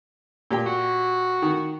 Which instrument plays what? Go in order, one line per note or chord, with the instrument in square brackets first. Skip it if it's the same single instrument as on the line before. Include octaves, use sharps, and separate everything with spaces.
[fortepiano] A#2 G4 G5
[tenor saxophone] F#4
[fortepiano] D#3